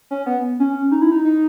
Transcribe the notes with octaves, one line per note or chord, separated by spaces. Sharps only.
C#4
B3
C#4
D#4
E4
D#4
D#4